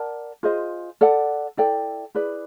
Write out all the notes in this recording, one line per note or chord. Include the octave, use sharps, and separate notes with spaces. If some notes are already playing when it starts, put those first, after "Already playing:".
Already playing: A#4 D5 F#5 A5
F4 G#4 C5 D#5
A4 D5 F#5
E4 A4 D5 G5
E4 G#4 B4 D5